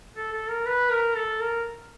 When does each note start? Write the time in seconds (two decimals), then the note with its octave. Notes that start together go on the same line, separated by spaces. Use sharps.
0.16 A4
0.33 A4
0.49 A#4
0.66 B4
0.91 A#4
1.16 A4
1.40 A#4